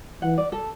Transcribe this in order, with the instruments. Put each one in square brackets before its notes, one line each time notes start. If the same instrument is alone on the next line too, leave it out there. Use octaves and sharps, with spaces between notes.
[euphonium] E3 [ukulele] F#5
[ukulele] D5
A4